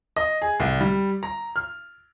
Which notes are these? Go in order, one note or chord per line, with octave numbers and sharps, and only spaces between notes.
D#5
G#4
C2
G3
A#5
F6